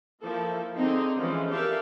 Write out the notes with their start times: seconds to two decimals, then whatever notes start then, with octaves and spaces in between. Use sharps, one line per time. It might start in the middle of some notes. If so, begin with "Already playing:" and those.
0.25 F3 A#3 E4 A4
0.74 D3 C4 D#4 G#4
1.19 E3 F3 G#3 C#4
1.50 G4 A4 A#4 D5 E5 F5